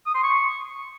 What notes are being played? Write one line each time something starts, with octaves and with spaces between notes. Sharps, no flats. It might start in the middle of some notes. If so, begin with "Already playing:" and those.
D#6
C6
C#6